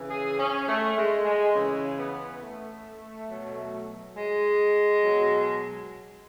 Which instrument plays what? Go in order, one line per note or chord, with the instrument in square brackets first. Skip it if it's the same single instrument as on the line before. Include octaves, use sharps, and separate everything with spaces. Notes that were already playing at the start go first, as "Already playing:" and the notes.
Already playing: [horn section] C#3 E3
G#4
C#4
A3
G#3
G#3
C#3 E3
B3
A3
B2 F#3
G#3
B2 F#3